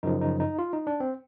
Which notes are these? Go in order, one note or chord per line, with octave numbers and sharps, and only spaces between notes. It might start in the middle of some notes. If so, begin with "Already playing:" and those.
F#2 C#3 F3 D#4
D#4
D#4
F4
D#4
D4
C4